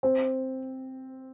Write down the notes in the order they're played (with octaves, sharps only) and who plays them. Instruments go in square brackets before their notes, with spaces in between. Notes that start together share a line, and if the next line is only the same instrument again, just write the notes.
[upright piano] C4